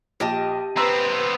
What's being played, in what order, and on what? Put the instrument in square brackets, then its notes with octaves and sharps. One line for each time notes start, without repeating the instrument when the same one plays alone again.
[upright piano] A#1 [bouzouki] G4 D#5 A5
[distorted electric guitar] B3 C4 [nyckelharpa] B4 [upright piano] A#5 C6 E6